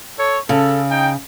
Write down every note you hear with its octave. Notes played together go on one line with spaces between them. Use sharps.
A4 C#5
C#3 A4
D#4 G5